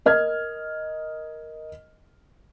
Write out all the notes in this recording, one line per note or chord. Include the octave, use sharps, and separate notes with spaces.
A#4 D#5 F6 G#6